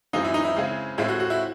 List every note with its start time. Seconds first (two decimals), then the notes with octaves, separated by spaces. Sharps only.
0.13 F#2 E3 G#3 C4 D#4
0.24 E4
0.34 D#4
0.44 E4
0.56 C#3 G#3 C4
0.98 A2 G#3 C4 E4
1.08 F#4
1.20 F#4
1.30 E4